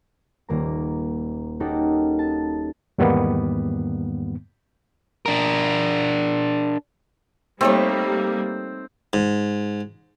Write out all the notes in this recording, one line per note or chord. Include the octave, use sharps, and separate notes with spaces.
D#1 A#3 A#5
A#3 C#4 D#4 F#4 G4 A4
A5
E2 G#2 D#3 G3 A#3 B3
D4 A#4
G3 A3 A#3 C4 D#4 C#5
G#2